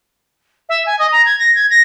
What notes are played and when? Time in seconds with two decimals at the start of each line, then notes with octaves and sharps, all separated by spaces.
0.69 E5
0.86 G#5
0.99 D#5
1.12 A#5
1.26 G#6
1.39 A#6
1.55 G#6
1.70 A#6